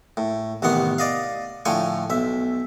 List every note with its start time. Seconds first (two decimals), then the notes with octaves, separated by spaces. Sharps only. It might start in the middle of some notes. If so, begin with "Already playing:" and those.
0.17 A2
0.62 A1 C3 D#3 B3 F#5
0.98 D5 D#5 F5
1.65 A2 D3 F3 G5 G#5 C#6
2.10 B1 E5